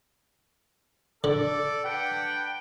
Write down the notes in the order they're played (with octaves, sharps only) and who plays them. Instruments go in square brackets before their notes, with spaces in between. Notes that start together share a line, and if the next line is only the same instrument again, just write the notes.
[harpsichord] D3 [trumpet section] A4 D5
[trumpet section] D4 B4 F#5 [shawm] G5